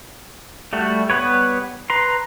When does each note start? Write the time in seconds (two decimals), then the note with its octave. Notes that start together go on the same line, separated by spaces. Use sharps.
0.73 G3 A3 F#4
1.10 G3 B3 B4 C#5
1.90 B4 A#5 C6